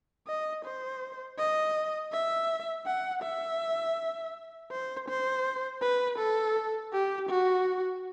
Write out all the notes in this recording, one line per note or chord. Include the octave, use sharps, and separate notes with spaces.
D#5
C5
D#5
E5
F#5
E5
C5
C5
B4
A4
G4
F#4